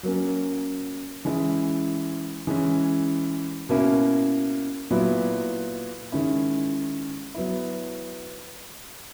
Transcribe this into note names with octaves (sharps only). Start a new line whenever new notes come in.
F#3 A#3 C#4
E3 G#3 C#4 E4
E3 G#3 C#4
B2 A#3 C#4 E4
A#2 F#3 B3 E4
D#3 G#3 C#4 E4
F#3 B3 E4